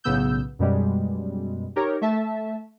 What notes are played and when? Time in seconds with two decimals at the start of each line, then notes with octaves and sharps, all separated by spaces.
0.04 B1 A2 C#3 B3 E6 G6
0.59 F#2 B2 G3 G#3
1.76 D#4 G4 A#4 C#5
2.01 A3 E5 A5